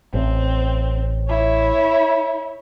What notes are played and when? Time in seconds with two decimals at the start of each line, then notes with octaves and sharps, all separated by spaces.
0.14 A1 C4
1.28 E4 C#5